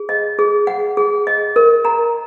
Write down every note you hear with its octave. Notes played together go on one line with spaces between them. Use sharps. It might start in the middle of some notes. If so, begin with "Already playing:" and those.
Already playing: G#4
D#5
G#4
F#5
G#4
D#5
A#4
A#5